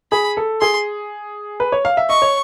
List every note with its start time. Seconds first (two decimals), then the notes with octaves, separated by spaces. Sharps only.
0.12 G#4 B5
0.37 A4
0.61 G#4 C6
1.60 B4
1.72 C#5
1.85 F5
1.97 E5
2.09 D#5 C#6
2.22 C#5